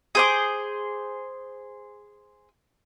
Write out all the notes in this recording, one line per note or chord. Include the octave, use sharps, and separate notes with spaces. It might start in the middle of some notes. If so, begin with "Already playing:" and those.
G#4 C5 D6